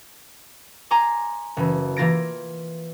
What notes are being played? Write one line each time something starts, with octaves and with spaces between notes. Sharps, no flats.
G#5 A#5 C6 D6
F#1 E3
E3 A#3 F4 A6 A#6 D7